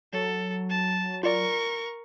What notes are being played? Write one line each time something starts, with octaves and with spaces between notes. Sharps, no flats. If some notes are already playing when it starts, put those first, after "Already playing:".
F#3 A4
A5
F4 A#4 D5 C#6